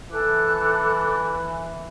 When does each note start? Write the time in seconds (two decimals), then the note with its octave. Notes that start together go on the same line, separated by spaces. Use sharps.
0.11 E3 A4 D6 F#6